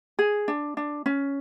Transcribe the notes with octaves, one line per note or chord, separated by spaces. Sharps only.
G#4
D4
D4
C#4